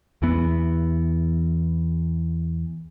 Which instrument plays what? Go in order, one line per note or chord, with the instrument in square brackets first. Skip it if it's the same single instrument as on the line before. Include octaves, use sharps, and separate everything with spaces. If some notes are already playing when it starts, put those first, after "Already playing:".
[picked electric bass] E2 E3 B3